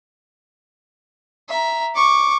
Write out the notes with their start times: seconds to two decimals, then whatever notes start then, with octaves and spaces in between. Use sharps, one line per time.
1.49 E5 A#5
1.95 C#6 D6